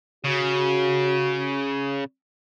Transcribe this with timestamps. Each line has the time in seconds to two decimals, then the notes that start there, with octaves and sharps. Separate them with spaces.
0.25 C#3 F#4